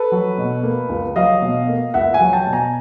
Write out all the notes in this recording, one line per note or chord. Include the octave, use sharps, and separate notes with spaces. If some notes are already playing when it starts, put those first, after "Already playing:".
Already playing: A4 B4
F#3
B2
A#3
C#2
F#3 D#5 F5
B2
A#3
C#2 E5 F#5
F#5 G#5
F#3
G5 A5
B2
G#5 A#5